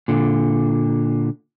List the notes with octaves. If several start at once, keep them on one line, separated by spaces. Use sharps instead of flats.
A#2 D3